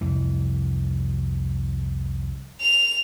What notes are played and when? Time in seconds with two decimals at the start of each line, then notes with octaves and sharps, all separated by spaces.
0.01 C2 F2 E3
2.61 F7